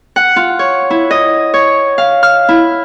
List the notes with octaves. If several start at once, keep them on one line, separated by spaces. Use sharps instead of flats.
F#5
F4
C#5
E4
D#5
C#5
F5
F6
E4